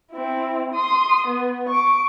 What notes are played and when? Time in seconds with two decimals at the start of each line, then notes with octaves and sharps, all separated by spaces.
0.12 C4 E4
0.74 C6 D#6
1.27 B3
1.69 C#6 D6